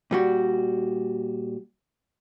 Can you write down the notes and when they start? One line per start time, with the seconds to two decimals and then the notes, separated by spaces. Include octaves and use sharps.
0.11 A#2 G3 F#4